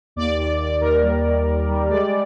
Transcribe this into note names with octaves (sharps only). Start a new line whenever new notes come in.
D#2 D5
D#2 D5
D#2 D5
D#2 A#4
G3
D#2
D#2
G3
G#3 D5